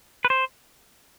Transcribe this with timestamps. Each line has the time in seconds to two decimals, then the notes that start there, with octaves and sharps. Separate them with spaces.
0.25 B4
0.30 C5